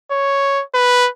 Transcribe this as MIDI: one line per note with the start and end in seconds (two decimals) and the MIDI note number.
0.11 0.63 73
0.74 1.09 71